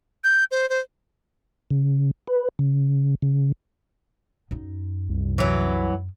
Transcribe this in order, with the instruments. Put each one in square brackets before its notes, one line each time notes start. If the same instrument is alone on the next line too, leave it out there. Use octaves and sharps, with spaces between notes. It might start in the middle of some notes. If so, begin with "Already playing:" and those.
[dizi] G6
C5
C5
[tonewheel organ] C#3
B4
C#3
C#3
[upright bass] F#2 D#4
[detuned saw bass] C2
[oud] E3 F#3